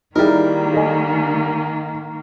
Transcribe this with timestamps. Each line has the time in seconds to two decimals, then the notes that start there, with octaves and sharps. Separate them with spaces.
0.16 D#3 G3 A#3 D#4 E4 G#4 A#4
0.74 A4 D#5 G#5